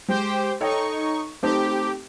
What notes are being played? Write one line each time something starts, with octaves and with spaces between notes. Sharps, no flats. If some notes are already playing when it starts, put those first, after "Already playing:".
G#3 G4 C5 G5
D#4 A4 C#5 G5 C#6
A3 C4 D#4 G4